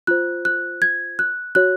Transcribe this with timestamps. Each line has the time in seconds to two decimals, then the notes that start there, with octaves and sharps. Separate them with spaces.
0.07 F4 C5 F#6
0.45 F#6
0.82 G#6
1.19 F#6
1.55 F#4 C#5 F#6